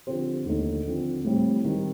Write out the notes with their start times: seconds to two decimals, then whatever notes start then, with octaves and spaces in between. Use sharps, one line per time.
0.07 D3 F3 C4 G4 C5
0.46 D#2 D3 A3 D#4 A4
0.86 D3 F3 C4
1.24 A2 G3 C4
1.64 D#3 G3 C4